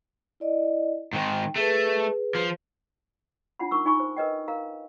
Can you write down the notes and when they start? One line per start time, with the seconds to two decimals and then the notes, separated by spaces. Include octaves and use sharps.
0.40 E4 D5 D#5
1.13 G#2 D#3 G5
1.56 A3 G#4 B4
2.35 F3
3.59 D4 F4 F#5 B5
3.71 D#4 A#4 C#6 E6
3.85 D#4 G#5 B5 C#6
4.00 C5
4.17 A#4 B4 D#5 G5
4.48 A#4 F5 A#5